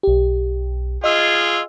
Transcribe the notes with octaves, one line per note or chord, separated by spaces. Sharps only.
B1 G4
F4 G#4 D#5 E6